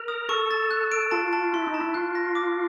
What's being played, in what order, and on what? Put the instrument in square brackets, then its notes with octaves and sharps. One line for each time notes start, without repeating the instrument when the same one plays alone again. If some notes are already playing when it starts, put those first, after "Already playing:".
Already playing: [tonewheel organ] A#4
[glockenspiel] D#6
[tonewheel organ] A4 [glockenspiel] C#6
[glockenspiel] A6
F#6
D7
[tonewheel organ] F4 [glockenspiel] A5
[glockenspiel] A5
[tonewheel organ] E4 [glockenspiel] C6
[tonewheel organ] D#4
[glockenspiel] A5
[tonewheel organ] E4
[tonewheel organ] F4 [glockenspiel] F#6
[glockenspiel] A#6
D6